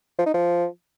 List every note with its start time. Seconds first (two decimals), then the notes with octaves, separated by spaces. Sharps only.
0.18 F3
0.26 D#4
0.34 F3